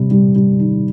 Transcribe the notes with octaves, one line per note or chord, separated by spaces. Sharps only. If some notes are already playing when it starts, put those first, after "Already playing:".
Already playing: C3 G3
G3
G3
D#3